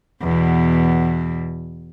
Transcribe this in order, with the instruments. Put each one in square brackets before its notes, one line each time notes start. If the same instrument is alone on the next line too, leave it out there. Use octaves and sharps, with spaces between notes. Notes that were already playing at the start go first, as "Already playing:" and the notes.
[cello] E2 B2